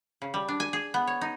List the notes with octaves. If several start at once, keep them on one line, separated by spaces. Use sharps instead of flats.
C#3
G3
D4
G#5
G#4
B3
C#5
D#4